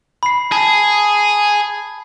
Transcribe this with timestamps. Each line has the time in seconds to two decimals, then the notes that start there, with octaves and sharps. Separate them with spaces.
0.23 B5 C7
0.52 G#4 A5